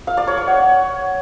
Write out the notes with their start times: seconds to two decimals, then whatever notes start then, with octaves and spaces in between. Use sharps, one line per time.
0.07 F5
0.17 D5
0.27 C#5
0.37 C#5
0.48 F#5